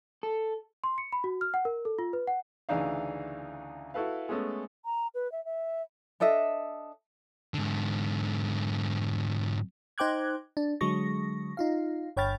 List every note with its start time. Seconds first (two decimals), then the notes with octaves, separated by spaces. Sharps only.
0.23 A4
0.84 C6
0.98 C#7
1.13 B5
1.24 F#4
1.41 F6
1.54 F#5
1.65 A#4
1.85 A4
1.99 F4
2.13 B4
2.27 F#5
2.69 D2 C#3 E3 D4 D#4 F5
3.94 E4 F#4 A4 B4 F5
4.29 G#3 A3 B3 C#4 A4
4.85 A#5
5.15 B4
5.32 E5
5.45 E5
6.20 D4 A4 D#5 E5
7.54 G#2 D3
9.98 D#4 C5 G5 D6 F#6 G#6
10.57 D4
10.81 D3 F#3 G#3 C#6 A#6
11.57 D#4 F4 F5
12.17 G1 C#5 G5 B5 F6 A6